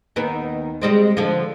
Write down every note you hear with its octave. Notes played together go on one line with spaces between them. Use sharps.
D#2 D#3 B3
G3 G#3 C4
D3 F3